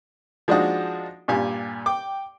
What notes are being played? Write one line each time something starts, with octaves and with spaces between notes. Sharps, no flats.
F3 G#3 D4 D#4 F#4
G2 A#2 G4 G#5
G5 D6